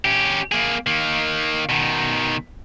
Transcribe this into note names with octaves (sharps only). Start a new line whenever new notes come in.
C#4 G4
A#3 G#4
D#3 A#3
B2 D#3